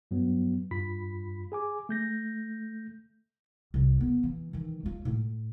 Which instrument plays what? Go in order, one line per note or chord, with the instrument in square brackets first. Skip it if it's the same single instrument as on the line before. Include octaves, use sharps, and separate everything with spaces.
[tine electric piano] G2 F#3 B3
G2 F4 B5 B6
G#4 G#5 D6
A3 G6 A#6
[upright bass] C2
B3
E3
D#3 E3
G#3 F4
A2